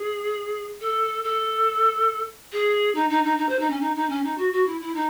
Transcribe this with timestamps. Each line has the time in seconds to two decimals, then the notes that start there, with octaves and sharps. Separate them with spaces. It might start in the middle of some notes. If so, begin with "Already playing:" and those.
Already playing: G#4
0.80 A4
1.23 A4
2.51 G#4
2.94 D#4
3.09 D#4
3.23 D#4
3.37 D#4
3.48 C5
3.59 D#4
3.70 C#4
3.80 D#4
3.95 D#4
4.09 C#4
4.23 D#4
4.37 F#4
4.52 F#4
4.66 E4
4.80 E4
4.94 D#4